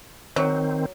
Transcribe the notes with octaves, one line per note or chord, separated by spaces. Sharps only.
D#3 F#3 C4